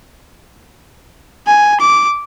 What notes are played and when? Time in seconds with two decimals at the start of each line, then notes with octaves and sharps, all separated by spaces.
1.47 G#5
1.80 D6